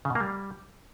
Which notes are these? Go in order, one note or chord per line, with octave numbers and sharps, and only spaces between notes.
C#3
B2
A#3
G3